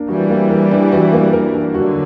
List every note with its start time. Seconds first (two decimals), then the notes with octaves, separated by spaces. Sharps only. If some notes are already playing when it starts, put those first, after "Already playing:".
Already playing: A#3 D4 A#4
0.09 E3 G3 F#4
0.30 A#3
0.50 A#4
0.71 D4
0.92 F#4
1.12 A#3
1.33 A#4
1.54 D4
1.74 D3 F#3 F#4